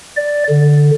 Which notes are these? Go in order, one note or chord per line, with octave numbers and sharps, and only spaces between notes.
D5
D3